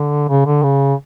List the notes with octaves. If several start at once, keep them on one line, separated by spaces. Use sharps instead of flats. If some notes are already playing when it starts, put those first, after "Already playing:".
Already playing: D3
C#3
D3
C#3